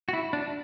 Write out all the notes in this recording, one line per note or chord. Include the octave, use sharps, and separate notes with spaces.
F#4
E4
D4